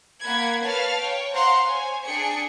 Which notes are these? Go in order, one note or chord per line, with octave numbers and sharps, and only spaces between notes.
A#3 F#5 B5 G#6
B4 C#5 F5 A5 F6
C#5 G5
C5 F5 F#5 A#5 C6
C5 C#5 G#5
D4 G#4 G5 C#7